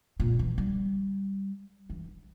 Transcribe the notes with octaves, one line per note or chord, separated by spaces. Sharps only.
A#2
E3
G3
E3